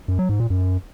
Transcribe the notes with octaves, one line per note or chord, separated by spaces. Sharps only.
F#2
F#3
G#2
A#2
F#2